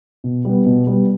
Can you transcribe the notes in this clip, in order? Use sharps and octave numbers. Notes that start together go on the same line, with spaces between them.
B2
G3 B3
B2
G3 B3